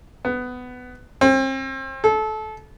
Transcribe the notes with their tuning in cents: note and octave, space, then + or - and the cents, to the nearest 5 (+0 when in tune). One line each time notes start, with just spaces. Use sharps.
B3 +15
C4 +35
A4 -25